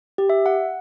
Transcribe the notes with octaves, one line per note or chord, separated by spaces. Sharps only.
G4
E5
F#5